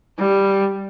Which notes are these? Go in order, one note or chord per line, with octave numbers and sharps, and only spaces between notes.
G3